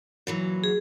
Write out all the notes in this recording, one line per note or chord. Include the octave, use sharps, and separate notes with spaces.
A#2 E3 F#3
G#4